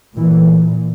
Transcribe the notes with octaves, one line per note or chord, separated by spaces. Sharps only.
A#2 E3